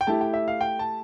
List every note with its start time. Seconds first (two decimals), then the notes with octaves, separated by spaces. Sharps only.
0.01 G5
0.07 A3 E4 G4 A5
0.21 G5
0.33 E5
0.48 F5
0.61 G5
0.79 A5